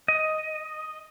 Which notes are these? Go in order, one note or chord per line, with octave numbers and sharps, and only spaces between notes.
D#5